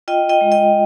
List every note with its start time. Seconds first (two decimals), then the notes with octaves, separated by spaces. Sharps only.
0.08 F4 D#5 G5
0.29 D#5 G5
0.41 G#3
0.52 D#5 G5